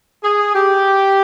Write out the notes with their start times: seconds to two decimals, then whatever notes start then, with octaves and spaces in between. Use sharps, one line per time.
0.24 G#4
0.55 G4